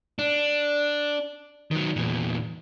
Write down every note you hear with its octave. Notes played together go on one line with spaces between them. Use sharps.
D4
D#3 F#3
E2 A#2